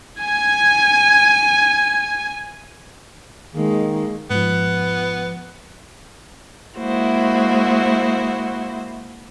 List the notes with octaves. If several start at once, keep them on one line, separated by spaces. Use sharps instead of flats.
G#5 G#6
D#3 G#3 A#3
G#2 F3 B3
G#3 A#3 E4 F#4 C5